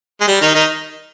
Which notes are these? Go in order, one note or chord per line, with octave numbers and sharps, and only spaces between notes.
G#3
G3
D#3 D#4
D#3 D#4